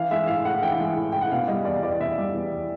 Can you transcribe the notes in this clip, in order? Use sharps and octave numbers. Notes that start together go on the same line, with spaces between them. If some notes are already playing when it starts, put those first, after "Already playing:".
Already playing: E3 F5
G#3 E5
A2 F5
A2 F#5
E3 G5
G#3
A2
A2 G5
F#5
B2 F5
G3 D#5
E2 D5
E2 D5
B2 E5
G3
E2